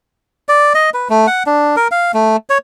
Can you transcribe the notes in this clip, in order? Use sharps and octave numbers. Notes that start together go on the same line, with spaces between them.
D5
D#5
B4
A3
F#5
D4
A#4
F5
A3
C#5